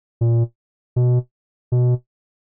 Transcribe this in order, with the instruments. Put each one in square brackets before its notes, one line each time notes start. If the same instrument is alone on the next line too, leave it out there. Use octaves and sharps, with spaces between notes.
[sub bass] A#2
B2
B2